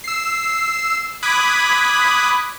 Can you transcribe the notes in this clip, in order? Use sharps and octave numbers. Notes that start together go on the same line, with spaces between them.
E6 C7
B5 D6 D#6 F#6 G#6 B6